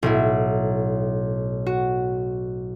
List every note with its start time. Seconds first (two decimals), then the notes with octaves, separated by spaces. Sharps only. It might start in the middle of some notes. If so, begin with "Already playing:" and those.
0.03 B1 A2 E4
1.66 F#4